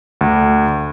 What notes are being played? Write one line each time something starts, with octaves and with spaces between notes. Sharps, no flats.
D2